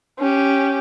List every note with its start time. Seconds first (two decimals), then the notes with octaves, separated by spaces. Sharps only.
0.19 C#4 G4